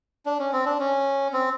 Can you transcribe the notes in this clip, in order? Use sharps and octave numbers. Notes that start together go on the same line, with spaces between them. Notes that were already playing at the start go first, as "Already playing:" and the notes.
D4
C#4
C4
D4
C#4
C4